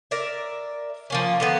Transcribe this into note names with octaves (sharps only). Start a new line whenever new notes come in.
A#4 D5 E5
F3 A#3 C#4
D3 A#3 B3